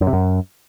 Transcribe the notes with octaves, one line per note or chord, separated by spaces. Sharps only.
F#2
C3
F#2